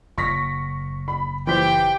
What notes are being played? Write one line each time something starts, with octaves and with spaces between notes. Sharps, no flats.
F#1 C#6 A#6 B6
B5
E3 G4 C5 G5 B6